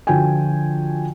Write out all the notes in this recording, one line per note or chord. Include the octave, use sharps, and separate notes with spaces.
D3 F3 F4 F#4 G5 G#5